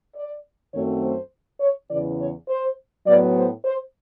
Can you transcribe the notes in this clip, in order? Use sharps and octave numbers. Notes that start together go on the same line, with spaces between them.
D5
F#2 D#3 F#3 A3 C4 C#5
C5
C#5
E2 C#3 E3 D5
C#5
C5
A2 F#3 B3 D5
C5
C5